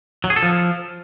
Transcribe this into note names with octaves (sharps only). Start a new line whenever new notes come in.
F#3
G#4
A4
F3